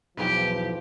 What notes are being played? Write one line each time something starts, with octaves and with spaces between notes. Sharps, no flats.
B1 E2 F3 G4 B4